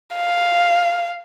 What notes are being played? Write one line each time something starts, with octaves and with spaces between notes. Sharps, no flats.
F5